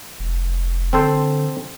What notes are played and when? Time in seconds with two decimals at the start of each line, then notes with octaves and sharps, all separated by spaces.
0.20 F1
0.93 D3 C4 A4 C5